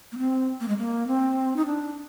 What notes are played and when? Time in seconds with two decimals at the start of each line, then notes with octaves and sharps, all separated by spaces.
0.12 A#3
0.18 C4
0.60 A#3
0.68 G#3
0.78 A#3
1.08 C4
1.56 D#4
1.66 D4